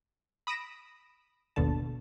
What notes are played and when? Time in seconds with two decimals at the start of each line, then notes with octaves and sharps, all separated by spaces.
0.47 B5 D#6 A#6 D7 E7
1.56 G1 D#2 B2 D3 A5